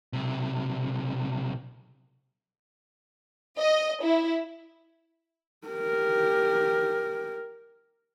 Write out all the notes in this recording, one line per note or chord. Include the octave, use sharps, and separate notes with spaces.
B1 C3
D#5
E4
G4 A#4